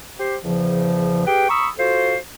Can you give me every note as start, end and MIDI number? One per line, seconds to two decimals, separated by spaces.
0.18 0.37 67
0.18 0.37 72
0.44 1.26 40
0.44 1.26 49
0.44 1.26 53
1.26 1.46 67
1.26 1.46 68
1.26 1.46 71
1.26 1.46 79
1.49 1.68 82
1.49 1.68 83
1.49 1.68 85
1.49 1.68 87
1.49 1.68 88
1.78 2.16 65
1.78 2.16 66
1.78 2.16 69
1.78 2.16 72